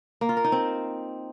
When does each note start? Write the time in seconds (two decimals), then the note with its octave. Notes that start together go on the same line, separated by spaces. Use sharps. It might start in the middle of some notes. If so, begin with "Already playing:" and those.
0.21 A#3
0.29 F4
0.37 A#4
0.44 D#4
0.52 C4